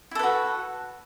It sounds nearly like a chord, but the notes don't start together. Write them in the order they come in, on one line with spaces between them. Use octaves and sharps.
E4 A4 B4 F#4